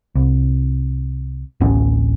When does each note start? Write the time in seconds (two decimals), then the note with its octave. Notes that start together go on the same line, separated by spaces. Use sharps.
0.15 C2
1.60 D1 A1 B3 C#4